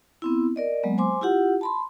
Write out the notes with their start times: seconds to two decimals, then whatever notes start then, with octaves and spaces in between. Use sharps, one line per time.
0.22 B3 C4 E4
0.56 A#4 D5 D#5
0.83 F#3 G#3 A#3 B3
0.98 C5 G#5 C6 D6
1.21 E4 F4 G4 F#5
1.61 A5 B5 C6